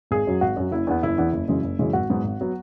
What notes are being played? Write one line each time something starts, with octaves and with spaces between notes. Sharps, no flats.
G#1 G#4
F#2 F#3
G#1 F#4
F#2 F#3
F#1 E4
E2 E3 B3
F#1 E4
E2 E3 B3
F#1
F#2 C#3 E3 G#3
F#1
F#2 C#3 E3 G#3
G#1 F#4
G#2 F#3 B3
G#1
F#3 B3